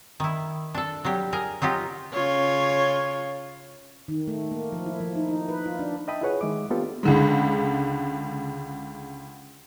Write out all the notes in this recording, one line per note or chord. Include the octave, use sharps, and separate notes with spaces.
D#3 E4
D4 A4
F#3 G3 G4
G#4 A#4
F#3 D#4 F4 G4
C#3 F4 C#5
D#3
A3
A#3
F3
E4
F3
D#4
D#4
B4
F4
D4
D#5 E5 G5 A5 B5 D#6
E4 F4 G#4 B4 C#5 F#5
D#3 G#3 E5 D6
A#3 B3 D4 F4 G4 A4
C#2 D3 G#3